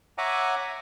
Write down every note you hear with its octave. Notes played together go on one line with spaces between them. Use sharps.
C#5 E5 F#5 G#5 A#5 D6